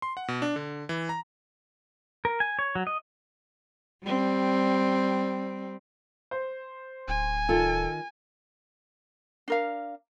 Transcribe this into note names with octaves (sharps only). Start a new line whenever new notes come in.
C6
F#5
B2
D4
D3
E3
A#5
A#4
G#5
C#5
F#3
D#5
G3 C4
C5
D1 G#5
D#3 D#4 F4 A4
D4 A#4 F5